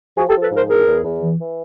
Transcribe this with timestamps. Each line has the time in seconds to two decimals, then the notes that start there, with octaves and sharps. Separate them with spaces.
0.16 F3 F#4 G#4
0.29 G4 A4
0.35 F3
0.42 A4 B4
0.52 G#2 A#4 C5
0.69 E2 G#4 A#4
0.87 E2
1.04 E2
1.21 E3
1.39 E3